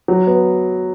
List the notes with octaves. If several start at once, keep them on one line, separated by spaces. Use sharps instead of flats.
F#3
B3